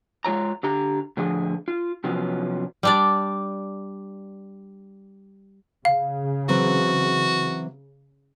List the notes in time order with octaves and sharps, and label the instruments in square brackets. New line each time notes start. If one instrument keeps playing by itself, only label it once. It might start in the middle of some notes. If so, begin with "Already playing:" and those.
[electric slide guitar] G#3 F4 C#5 A#5
D3 G4 A#5
A2 D3 F3 G#4
F4
C3 F3 F#3 B3 C#4
[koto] G3 D4 D5
[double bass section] C#3 [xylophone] F5
[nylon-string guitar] E3 F#3 C4 [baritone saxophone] F#4